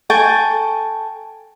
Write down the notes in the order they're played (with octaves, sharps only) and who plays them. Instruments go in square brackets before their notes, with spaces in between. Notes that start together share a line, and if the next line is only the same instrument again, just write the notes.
[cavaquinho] A4 G5 G#5 C#6